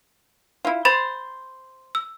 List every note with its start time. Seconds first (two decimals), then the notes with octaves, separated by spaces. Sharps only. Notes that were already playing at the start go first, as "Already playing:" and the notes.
0.65 E4 F4
0.85 C5 B5 C6 A6
1.95 E6